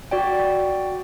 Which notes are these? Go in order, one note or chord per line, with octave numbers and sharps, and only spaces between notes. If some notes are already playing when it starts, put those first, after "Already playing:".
F#4 D5 G5